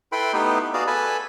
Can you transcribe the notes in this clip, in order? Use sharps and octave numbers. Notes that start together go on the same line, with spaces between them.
E4 A4 B4 G5 B5 C6
A3 B3 D#4 E4 G4 B4
B3 F#4 G#4 D5 F5
A4 B4 G#5 A5 B5